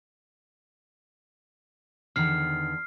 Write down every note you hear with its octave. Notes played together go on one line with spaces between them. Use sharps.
E2 D3 D#3 F6 C7